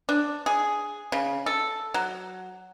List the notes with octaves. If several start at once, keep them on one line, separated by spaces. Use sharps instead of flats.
D4
G#4
C#3
A4
F#3